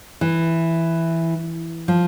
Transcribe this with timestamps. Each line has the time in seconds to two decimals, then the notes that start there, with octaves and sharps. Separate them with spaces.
0.21 E3
1.88 F3